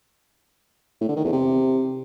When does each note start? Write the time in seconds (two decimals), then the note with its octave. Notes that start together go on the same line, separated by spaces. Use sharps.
1.01 A2
1.09 D3
1.17 D#3
1.24 E2
1.32 C3